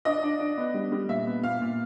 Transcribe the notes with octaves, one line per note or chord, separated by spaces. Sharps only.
D4 D#5
D4
D4
B3
G3
G3
A#2 E5
B3
A#2 F5
A#2